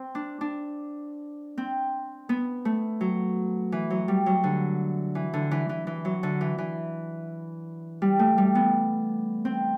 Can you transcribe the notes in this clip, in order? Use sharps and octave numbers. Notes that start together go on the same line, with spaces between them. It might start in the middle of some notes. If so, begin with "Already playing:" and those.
Already playing: C4
D4
D4
C4
B3
A3
F#3
E3
F#3
G3
F#3
D3
E3
D3
E3
E3
E3
F#3
D3
E3
E3
G3
A3
G3
B3
C4